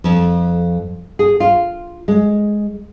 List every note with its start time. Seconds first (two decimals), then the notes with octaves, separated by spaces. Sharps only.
0.04 F2
1.19 G#4
1.40 F4
2.08 G#3